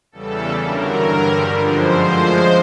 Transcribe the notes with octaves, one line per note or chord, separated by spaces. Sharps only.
E2 C#3 E3 G3 A4
G2 D3 F#3 A#4
G2 D3 G3
F#2 D3 F3 G#3 C5
A2 F3 G#3